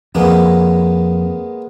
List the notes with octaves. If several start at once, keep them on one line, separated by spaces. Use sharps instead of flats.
F2 G#3 A#3 B3